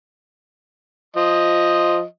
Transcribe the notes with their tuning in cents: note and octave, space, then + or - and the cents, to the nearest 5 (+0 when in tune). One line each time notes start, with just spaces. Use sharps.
F3 +0 D#5 +0